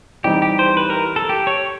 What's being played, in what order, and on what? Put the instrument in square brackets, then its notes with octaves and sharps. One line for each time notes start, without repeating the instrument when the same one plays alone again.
[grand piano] E3 G3 C4 D#4 [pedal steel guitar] G4
[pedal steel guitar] G4
C5
B4
A#4
A4
G4
C#5